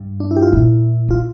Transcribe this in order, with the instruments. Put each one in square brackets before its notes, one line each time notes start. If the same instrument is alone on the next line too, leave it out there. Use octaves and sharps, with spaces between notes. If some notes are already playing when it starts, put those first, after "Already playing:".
Already playing: [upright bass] G2
[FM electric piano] D4
E4
G4
F4
[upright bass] A#2 [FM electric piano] E4
[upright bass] D3 [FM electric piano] F4